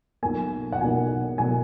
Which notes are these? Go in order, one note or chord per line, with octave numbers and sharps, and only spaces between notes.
B1 B2 A#3 G#5
F#5
B1 B2 A#3 G#5
B2 A#3 G#5